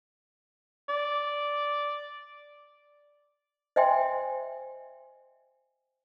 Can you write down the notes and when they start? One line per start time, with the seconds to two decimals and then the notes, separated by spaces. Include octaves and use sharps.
0.89 D5
3.76 C5 D#5 E5 G5 G#5 C6